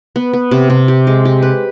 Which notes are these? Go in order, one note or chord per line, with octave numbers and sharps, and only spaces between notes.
B3
B3
C3
C3
G4
G#3
G4
B4